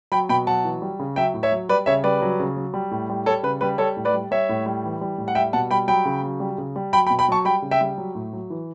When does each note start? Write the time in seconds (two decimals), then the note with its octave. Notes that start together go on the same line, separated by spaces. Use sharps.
0.12 F#3 G5 B5
0.29 B2 G5 B5
0.47 F#3 F#5 A5
0.64 E3
0.82 G3
0.99 C#3
1.16 F#3 E5 G5
1.34 A2
1.43 C#5 E5
1.52 F#3
1.69 G3 B4 D5
1.86 C#3 C#5 E5
2.04 G3 B4 D5
2.22 F#3
2.40 C#3
2.57 F#3
2.74 G3
2.91 A2
3.10 G3
3.26 G3 A4 C#5
3.43 C#3 B4
3.61 G3 B4
3.78 G3 A4 C#5
3.97 A2
4.05 B4 D5
4.14 G3
4.31 G3 C#5 E5
4.49 A2
4.66 G3
4.84 E3
5.01 G3
5.18 A2
5.28 F#5
5.35 G3 E5 G5
5.53 B2 F#5 A5
5.71 G3 G5 B5
5.88 F#3 G5 B5
6.05 C#3
6.23 F#3
6.40 G3
6.58 C#3
6.76 G3
6.93 F#3 G5 B5
7.07 G5 B5
7.10 B2
7.19 G5 B5
7.28 F#3 A5 C#6
7.45 G3 G5 B5
7.62 C#3
7.71 E5 G5
7.81 G3
7.98 F#3
8.15 A2
8.33 F#3
8.50 E3